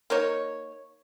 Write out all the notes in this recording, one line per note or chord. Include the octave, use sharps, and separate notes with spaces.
A#3 D#4 C#5